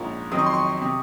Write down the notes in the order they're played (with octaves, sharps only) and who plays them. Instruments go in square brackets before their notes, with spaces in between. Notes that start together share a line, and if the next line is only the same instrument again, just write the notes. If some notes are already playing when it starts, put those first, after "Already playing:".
Already playing: [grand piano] A#1 G#2 F3 A#3 C#4
F2 D#3 F#3 C4 D#6
C#6
C6
C#6
C3